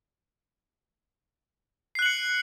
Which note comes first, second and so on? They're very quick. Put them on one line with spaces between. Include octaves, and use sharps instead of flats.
C7 F#6 F#7 C#7